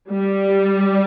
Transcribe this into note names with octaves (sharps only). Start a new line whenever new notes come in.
G3